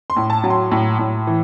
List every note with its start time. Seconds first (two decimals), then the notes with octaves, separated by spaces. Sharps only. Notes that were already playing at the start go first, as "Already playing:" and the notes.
0.10 C6
0.16 A2
0.30 A5
0.44 F#3
0.50 C6
0.71 A2
0.99 A2
1.27 E3